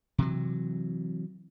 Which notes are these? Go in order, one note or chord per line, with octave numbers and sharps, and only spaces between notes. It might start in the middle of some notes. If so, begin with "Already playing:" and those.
C3 E3 F#3